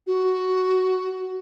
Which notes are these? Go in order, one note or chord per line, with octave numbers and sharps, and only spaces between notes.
F#4